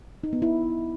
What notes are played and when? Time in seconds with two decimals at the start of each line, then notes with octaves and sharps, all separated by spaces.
0.24 D#4
0.33 B3
0.42 E4